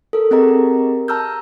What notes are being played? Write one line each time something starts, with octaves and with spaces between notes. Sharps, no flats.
A4 A#4
C4 G4 G#4 A#4 D#5 A#5
A5 A#5 E6 F6 G6